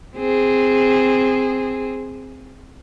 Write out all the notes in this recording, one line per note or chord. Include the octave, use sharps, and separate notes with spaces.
C4 G#4